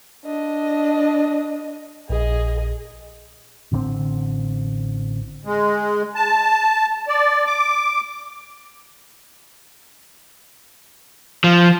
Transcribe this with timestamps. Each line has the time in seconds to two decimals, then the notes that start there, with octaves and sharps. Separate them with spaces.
0.25 D4 D#5
2.09 A#1 G#4 D#5
3.72 A1 D3 G3 C4
5.45 G#3
6.15 A5
7.08 D5
7.46 D6
11.44 F3